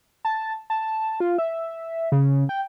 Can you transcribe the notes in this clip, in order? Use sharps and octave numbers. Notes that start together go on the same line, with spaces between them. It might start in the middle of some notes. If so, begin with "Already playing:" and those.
A5
A5
F4
E5
C#3
G5